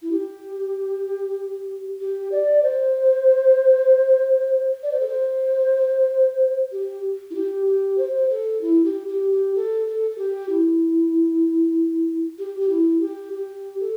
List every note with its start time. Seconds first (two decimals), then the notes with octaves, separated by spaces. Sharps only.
0.02 E4
0.11 G4
2.00 G4
2.32 D5
2.63 C5
4.83 D5
4.91 C5
5.00 A4
5.08 C5
6.72 G4
7.30 E4
7.35 G4
7.66 G4
7.98 C5
8.29 A4
8.61 E4
8.84 G4
9.07 G4
9.31 G4
9.55 A4
9.87 A4
10.11 A4
10.18 G4
10.49 E4
12.38 G4
12.60 G4
12.69 E4
13.00 G4
13.32 G4
13.80 A4